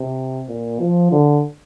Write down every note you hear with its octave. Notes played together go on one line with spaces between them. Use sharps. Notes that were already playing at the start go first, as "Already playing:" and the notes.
Already playing: C3
A#2
F3
D3